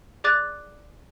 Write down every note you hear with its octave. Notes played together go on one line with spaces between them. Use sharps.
G#4 D5 D6 F#6 A6